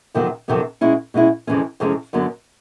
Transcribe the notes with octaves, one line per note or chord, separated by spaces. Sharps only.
F2 C3 D#3 F#3 B3
F2 C3 D#3 F#3 B3
B2 G#3 C#4 E4
B2 G#3 C#4 E4
F2 C3 E3 G#3 C#4
F2 C3 E3 G#3 C#4
F#2 D3 F#3 B3